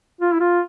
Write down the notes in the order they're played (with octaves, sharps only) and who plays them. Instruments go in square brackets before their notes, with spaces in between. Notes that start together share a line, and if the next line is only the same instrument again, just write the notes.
[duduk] F4
E4
F4